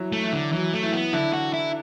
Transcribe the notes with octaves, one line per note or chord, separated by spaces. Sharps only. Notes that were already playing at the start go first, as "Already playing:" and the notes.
Already playing: E3 F#3
A3
E3
D3
E3 F#3
A3
E3
B3
D3 E4
F#4
E4